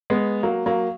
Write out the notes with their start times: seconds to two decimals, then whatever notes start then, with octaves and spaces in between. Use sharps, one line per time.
0.10 G#3 B3
0.43 F#3 A#3
0.66 F#3 A#3